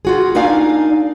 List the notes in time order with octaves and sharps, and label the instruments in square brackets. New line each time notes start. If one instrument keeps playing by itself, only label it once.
[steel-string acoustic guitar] F4 F#4 G#4
A#3 D4 D#4 D5 F5 G#5